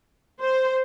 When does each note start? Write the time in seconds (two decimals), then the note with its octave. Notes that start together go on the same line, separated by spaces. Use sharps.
0.40 C5